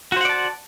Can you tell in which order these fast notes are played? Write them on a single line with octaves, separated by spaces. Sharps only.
F#4 C5 F#5 D5 A5